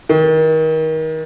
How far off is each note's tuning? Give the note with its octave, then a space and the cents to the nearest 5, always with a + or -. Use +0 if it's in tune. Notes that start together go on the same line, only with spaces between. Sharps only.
D#3 +30